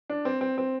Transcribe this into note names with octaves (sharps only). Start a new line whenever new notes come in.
D4
C4
C4
C4